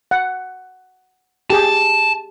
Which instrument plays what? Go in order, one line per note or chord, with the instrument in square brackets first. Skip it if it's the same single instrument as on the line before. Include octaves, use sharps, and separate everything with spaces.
[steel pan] F#5
[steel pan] G4 G#4 [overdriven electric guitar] A5